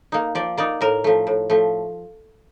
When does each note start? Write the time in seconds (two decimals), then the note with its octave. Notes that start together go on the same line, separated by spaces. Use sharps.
0.12 A#3 D#4
0.35 F3 D5
0.58 A#3 D#4 D5
0.81 A2 A#4
1.04 F3 A3
1.27 A2
1.50 F3 A3